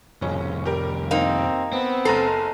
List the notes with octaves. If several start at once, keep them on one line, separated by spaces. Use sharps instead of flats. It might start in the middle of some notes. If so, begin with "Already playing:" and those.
C2 F2 C#3 C#4
G3 G4 A#4
A#3 C4 D#4
B3 C4
F#1 A4 A#5 C7